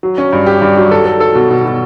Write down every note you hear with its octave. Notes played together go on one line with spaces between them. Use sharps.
F#3
C#4
G2
G4
G2
F#3
A4
A4
A4
B2
B2
B2